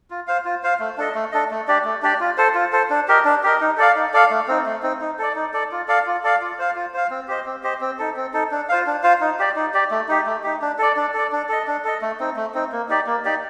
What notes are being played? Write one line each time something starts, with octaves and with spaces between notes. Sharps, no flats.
F4
C5 F5
F4
C5 F5
A3
D4 A4 D#5
A3
D4 A4 D#5
A3
D4 G4 D5
A3
D4 G4 D5
F4
A4 C5
F4
A4 C5
D4
G4 A#4 D#5
D4
G4 A#4 D#5
D#4
A4 D5 F5
D#4
A4 D5 F5
A3
C4 D#4
A3
C4 D#4
D#4
A4 D5
D#4
A4 D5
F4
A4 D5 F5
F4
A4 D5 F5
F4
C5 F5
F4
C5 F5
C4
G4 C5 D#5
C4
G4 C5 D#5
C4
D#4 A4
C4
D#4 A4
D4
F4 C5 F5
D4
F4 C5 F5
D#4
G4 D5
D#4
G4 D5
A3
D#4 G4
A3
D#4 G4
D4
A4 D5
D4
A4 D5
D4
A4 D#5
D4
A4 D#5
A3
C4 D#4
A3
C4 D#4
A#3
D#4 G4 D5
A#3
D#4 G4 D5